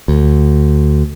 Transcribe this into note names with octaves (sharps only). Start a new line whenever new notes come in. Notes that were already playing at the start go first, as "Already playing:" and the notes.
D2